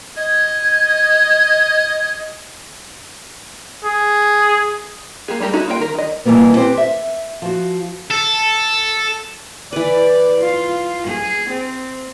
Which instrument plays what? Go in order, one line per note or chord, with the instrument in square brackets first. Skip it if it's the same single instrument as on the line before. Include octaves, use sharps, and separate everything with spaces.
[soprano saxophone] D#5 [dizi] G#6
[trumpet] G#4
[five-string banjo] A#3 G4 G#4
G3 A3 G4 A#4
C#4 D#4 E4 F#4 A4
A#3 F4 A#4 D#5 G5
D#3 A#4
D#3 D#5
[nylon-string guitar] B2 E3 F#3 G3 A#3 B3
C4 G4 B4 C5
E5
F3 F#4
[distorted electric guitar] A4
[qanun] E3 B4 [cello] D5
[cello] F4
G#4
C4